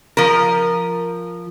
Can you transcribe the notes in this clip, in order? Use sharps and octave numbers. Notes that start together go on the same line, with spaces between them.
F3 A#4